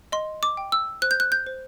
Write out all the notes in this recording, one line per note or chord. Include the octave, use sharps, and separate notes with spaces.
D#5 C6
D6
G5
E6
C5 F#6
G6
F#6
G6
C5